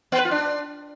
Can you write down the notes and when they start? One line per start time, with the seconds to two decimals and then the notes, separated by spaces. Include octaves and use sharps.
0.12 B3
0.18 B4
0.25 F4
0.31 D4